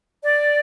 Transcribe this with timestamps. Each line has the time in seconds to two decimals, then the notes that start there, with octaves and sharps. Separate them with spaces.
0.23 D5